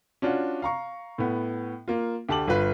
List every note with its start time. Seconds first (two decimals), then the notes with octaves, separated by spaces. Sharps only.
0.22 C#4 D4 F4 F#4
0.62 F5 A#5 C#6
1.18 A2 B3
1.88 A#3 F4
2.29 D2 G4 A5 D6 F#7
2.48 G1 F4 B4